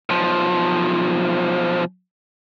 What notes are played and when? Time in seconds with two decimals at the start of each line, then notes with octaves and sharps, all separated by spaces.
0.10 B1 F3